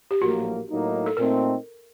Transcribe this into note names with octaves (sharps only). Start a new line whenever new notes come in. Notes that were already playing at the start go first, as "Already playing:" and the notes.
G4
A#1 A2 F#3 A#3 F#4
A2 F#3 A#3 D#4
A4
A#2 A3 C4 D#4 A#4